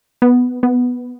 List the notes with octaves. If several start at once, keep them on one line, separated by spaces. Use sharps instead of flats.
B3
B3